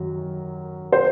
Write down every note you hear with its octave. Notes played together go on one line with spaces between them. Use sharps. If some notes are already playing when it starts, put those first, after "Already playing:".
Already playing: F#2 D#3 F#3
C5